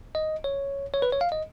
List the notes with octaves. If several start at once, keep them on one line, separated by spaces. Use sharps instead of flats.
D#5
C#5
C#5
B4
C#5
F5
D#5